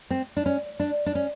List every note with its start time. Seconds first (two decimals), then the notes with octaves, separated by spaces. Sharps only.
0.10 C4
0.37 D4
0.46 C#4
0.80 D4
1.06 D4
1.15 C#4